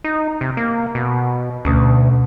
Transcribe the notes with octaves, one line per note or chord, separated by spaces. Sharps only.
D#4
C3
A#3
B2
D2 B2 A3 C#4